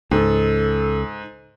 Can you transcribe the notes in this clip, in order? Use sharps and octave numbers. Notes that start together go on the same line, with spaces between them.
C#2 G#2 A4